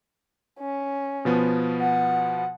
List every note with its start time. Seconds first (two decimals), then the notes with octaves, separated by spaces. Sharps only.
0.60 C#4
1.25 B2 F3 B3
1.80 F#5